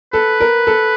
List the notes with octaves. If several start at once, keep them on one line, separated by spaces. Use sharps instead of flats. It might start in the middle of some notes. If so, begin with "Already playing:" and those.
A4 B4
A#4
A4